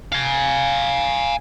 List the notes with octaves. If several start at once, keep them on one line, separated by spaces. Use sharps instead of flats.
F5 G#5